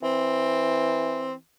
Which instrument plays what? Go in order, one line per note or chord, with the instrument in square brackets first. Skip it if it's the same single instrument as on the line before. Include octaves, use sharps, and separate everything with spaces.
[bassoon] E3 [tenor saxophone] C4